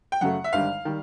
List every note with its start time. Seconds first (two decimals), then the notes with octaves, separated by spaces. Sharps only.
0.12 G5
0.21 F#2 C#3 F#3 A3 F#5
0.44 E5
0.53 G#1 G2 D3 G3 F5
0.85 D#3 G3